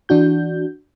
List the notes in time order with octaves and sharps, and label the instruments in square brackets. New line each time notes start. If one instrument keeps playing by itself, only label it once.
[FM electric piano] E3 D4 F#4 G6